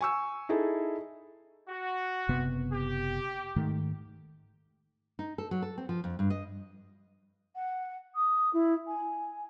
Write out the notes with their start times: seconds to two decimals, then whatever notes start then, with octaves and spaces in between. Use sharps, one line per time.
0.01 G#5 C#6 E6
0.49 D#4 E4 G#4 A4
1.68 F#4
2.29 F#1 C3 B3
2.72 G4
3.56 G#2 D#3 A3
5.19 D#4
5.38 A4
5.51 F#3
5.62 A4
5.78 C4
5.89 F3
6.04 F2
6.19 G2
6.30 D#5
7.55 F#5
8.14 D#6
8.53 E4
8.87 G#5